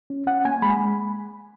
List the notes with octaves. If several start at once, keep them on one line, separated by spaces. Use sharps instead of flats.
C#4
C#4 F#5
A#3 G#5
G#3 B5